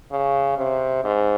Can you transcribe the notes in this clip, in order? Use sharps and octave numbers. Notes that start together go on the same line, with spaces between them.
C#3
C3
G#2